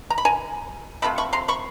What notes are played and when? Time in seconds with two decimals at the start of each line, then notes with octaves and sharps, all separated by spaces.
0.10 A#5
0.18 B5
0.25 G#5 A#5
1.02 C3 F3 A3 C4 B5
1.18 B5 C#6
1.33 A#5 C6
1.48 B5 C#6